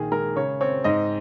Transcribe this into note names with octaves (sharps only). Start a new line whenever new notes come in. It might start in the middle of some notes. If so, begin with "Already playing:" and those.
Already playing: A#1 D#3 G#4
G#3 A#4
C#3 C#5
C4 C#5
G#2 D#5